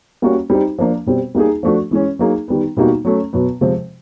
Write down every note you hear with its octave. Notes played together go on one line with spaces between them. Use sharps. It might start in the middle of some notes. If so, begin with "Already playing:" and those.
G3 A#3 C#4 F#4
G3 C4 D#4 G4
F3 A#3 D4
B2 G3 C4
G3 A#3 D#4 G#4
F3 A3 D4 F#4
E3 G#3 C#4
F#3 A#3 D#4 G#4
D#3 G3 B3
B2 G3 A#3 D#4 F#4
F#3 A3 C#4
B2 F#3 B3
C3 F3 G#3 C4